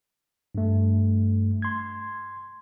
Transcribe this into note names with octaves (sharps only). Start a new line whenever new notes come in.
G2 A3
C6 G#6